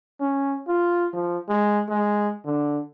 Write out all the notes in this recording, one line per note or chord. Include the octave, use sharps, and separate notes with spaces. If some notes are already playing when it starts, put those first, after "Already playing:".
C#4
F4
F3
G#3
G#3
D3